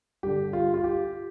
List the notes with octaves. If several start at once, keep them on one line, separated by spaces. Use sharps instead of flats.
G2 D3 G4
F4
F4
G4